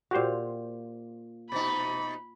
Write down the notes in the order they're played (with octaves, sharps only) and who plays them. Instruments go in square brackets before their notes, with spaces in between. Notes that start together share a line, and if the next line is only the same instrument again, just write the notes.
[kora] A#2 F5 [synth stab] F#4 G4 C5
[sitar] B2 D#4 [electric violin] B5